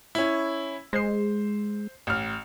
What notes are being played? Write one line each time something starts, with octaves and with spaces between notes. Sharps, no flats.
C#4 E4
G#3 C5 C7
A1 F6